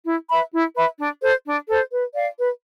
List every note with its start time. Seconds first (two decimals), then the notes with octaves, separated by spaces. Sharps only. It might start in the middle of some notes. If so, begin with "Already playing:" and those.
0.05 E4
0.29 B4 E5 B5
0.51 E4
0.75 B4 E5 B5
0.99 D4
1.22 A4 C5
1.46 D4
1.69 A4 C5
1.92 B4
2.15 D5 F5
2.38 B4